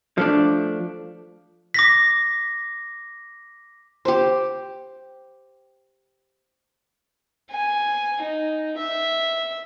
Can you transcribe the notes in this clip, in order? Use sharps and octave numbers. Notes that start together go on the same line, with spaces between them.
F3 A3 D4
D6 A#6 B6
G4 C5
G#5
D#4
E5